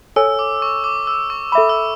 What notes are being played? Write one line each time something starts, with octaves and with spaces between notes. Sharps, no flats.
A4 C#5 G#5 E6
D6
C#6
D6
E6
C#6
A4 E5 B5 D6
E6